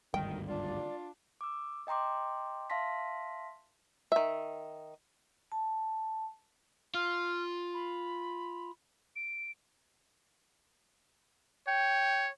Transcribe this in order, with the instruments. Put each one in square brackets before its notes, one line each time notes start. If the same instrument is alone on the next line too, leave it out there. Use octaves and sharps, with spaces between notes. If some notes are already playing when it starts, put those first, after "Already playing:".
[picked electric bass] G#1 D2 G2 [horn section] D#3 [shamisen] G5
[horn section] D4 F4 [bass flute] D5
[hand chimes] D6 E6
D#5 G5 A#5 C6 D6
E5 F5 A5 C6 A#6 B6
[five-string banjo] D#3 E5
[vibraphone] A5
[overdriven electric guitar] F4 [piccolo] F6
[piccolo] B5
D7
[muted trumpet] C#5 [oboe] G5